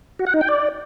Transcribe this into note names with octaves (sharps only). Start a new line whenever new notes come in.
F#4
F#5
D#4
G5
D5